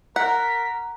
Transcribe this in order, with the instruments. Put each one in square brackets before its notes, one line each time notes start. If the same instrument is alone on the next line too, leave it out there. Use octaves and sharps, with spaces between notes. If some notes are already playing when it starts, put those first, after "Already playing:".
[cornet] A#4 [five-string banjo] F#5 [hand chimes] A#5 F#6 [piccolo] B6